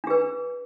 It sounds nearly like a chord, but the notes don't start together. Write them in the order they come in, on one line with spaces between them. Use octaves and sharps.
D4 G#4 B4